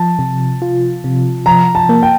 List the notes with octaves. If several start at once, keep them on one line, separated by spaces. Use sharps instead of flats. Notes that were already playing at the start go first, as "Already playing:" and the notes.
Already playing: F3 A5
C3
F4
C3
F3 A#5
A5
A#3
G5